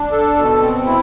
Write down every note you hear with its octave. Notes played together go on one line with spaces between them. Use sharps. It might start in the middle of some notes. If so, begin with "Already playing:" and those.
Already playing: D4
A4
B2
C4
E4